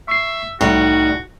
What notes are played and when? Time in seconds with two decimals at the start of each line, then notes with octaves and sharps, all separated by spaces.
0.08 E5 C#6 C7
0.61 C2 A2 G3 D#4 F#4 D5